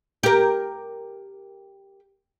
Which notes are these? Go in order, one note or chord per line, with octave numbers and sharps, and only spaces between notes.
G4 A#4